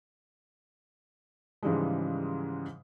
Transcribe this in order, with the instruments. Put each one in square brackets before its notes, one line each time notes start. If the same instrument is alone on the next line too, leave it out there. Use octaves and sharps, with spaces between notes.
[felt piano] G#2 C#3 E3 F3 G3 G#3